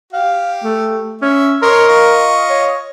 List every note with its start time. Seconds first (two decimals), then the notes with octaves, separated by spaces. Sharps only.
0.13 G4 F5
0.63 A3
1.22 C#4 E5
1.62 A#4 C#5 D#5 C6
1.88 F4 D#5 C#6
2.50 C#5